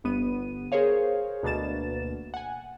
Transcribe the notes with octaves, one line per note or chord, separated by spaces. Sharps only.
G1 B3 D#7
G#4 A#4 C5 C#5 F5
D2 B2 A#3 A6 E7
F#5 G#5